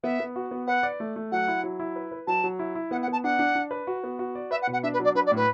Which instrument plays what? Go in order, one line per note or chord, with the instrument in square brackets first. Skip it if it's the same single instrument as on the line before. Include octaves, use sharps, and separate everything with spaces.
[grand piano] B3 [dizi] E5
[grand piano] B3
F#4
B3
[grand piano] B4 [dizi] F#5
[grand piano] D5
A3
A3
[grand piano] F#3 [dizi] F#5
[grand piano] E4
F#3
E4
B4
B4
[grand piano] F#3 [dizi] A5
[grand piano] F#3
E4
E4
[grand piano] B3 [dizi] F#5
[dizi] F#5
[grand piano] B3 [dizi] A5
[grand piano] D4 [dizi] F#5
[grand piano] D4
D4
B4
F#4
B3
F#4
D5
[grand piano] B4 [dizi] E5
[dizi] F#5
[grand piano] B2
[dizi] F#5
[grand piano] D4 [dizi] E5
[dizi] B4
[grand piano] F#3 [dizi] D5
[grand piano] D4 [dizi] B4
[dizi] D5
[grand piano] A2 [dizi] B4